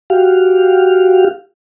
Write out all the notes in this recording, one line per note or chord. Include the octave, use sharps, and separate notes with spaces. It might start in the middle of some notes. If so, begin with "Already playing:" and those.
F#4 G4 F5